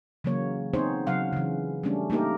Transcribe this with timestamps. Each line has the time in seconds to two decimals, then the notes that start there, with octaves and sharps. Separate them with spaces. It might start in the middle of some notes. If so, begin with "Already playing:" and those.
0.24 C#3 E3 F#3 A#3 C#5
0.74 B3 C4 D#4 G#4 C5 C#5
1.07 C#3 F#3 F5 F#5
1.33 C#3 E3
1.83 G3 A3 C#4 D4
2.10 A3 A#3 D#4 G4 A#4